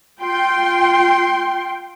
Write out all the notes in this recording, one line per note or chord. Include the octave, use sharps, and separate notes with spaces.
F4 G5 C6